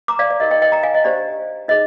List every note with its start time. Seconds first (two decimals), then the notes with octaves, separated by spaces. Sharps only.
0.08 A#5 D6
0.19 D5 F5
0.30 D5
0.40 D#4 G4 A#4 D#5
0.51 D#5 G5
0.62 D#5 G5
0.72 G5 A#5
0.83 F5 G#5
0.94 D#5
1.04 D4 G4 C5 D5
1.68 D#4 G#4 D#5